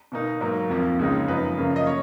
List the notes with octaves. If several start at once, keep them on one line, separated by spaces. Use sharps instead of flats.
B2 A#3 D#4
G#2 F#3 A#3
F2 F3 A#3
C#2 C#3 G#3 D#4
F#2 F3 B3 D#4 B4
F#2 C#3 F3 A#3
D#5
C#4 C#5